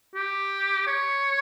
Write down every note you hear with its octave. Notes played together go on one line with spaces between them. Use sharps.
G4
C#5